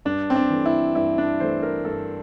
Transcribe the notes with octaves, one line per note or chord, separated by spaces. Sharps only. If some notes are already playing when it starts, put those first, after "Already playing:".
G2 D4
C4
D4
E3 A3
E4
G2 E4
D4
E3 A3 C5
A#4
G2 A4